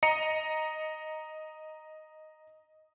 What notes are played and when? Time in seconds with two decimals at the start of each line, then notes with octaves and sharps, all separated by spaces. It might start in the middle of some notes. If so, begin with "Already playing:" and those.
0.03 D#5 A#5 C#7